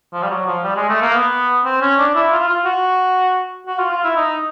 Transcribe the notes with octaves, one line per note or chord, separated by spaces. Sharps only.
F3
G3
F#3
F3
G3
G#3
A3
A#3
B3
C4
C#4
D4
E4
F4
F4
F#4
F#4
F4
F4
E4
D#4